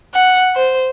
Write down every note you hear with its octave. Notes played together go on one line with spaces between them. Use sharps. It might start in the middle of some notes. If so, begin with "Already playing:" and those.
F#5
C5